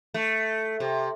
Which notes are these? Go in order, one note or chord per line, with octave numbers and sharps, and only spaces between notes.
A3
C3